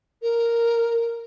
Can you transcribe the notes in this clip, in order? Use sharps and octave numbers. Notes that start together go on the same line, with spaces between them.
A#4